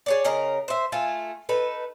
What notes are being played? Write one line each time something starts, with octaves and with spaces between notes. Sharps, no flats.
G#4 C#5 D5
C#3 A#4 D#5 A#5
C5 E5
A3 F4 G#5
D#4 A4 B4